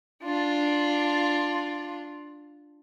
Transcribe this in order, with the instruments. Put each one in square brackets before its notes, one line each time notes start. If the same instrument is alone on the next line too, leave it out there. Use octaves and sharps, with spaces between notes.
[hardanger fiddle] D4 F4